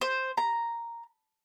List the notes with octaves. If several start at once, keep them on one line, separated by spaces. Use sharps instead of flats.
C5
A#5